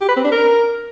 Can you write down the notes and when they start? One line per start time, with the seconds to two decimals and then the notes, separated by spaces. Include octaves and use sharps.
0.01 G4
0.09 B4
0.16 C4
0.24 D4
0.32 A#4